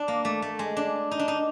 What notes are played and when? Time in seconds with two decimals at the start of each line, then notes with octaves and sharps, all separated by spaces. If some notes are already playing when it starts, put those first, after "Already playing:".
Already playing: D4
0.08 A#3
0.25 A3
0.42 A3
0.59 G#3
0.77 D4
1.11 D#4
1.19 D4
1.28 D#4